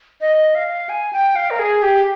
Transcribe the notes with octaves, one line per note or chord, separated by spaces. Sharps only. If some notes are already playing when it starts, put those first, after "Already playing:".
D#5
F5
G#5
G5
F5
A#4
G#4
G4